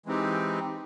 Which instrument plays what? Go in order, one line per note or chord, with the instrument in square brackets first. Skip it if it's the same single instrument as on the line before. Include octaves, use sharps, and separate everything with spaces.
[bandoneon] E3 G#3 C4 D#4 G4